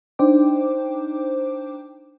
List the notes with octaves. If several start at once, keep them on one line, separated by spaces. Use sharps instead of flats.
D4 D#4 C5 G5 D6